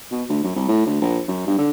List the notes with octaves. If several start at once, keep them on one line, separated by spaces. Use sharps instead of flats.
B2
D2
F#2
C2
A2
D2
A#1
F#2
G2
D3